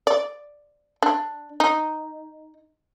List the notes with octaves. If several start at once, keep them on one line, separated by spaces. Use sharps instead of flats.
D5
D4
D#4